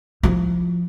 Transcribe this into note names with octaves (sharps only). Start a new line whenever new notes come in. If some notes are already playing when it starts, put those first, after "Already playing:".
F3 E4